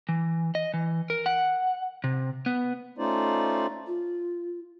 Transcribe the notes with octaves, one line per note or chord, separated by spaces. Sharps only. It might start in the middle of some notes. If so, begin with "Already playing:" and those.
E3
D#5
E3
A#4
F#5
C3
B3
A3 C#4 D#4 F4 C5 D5
F4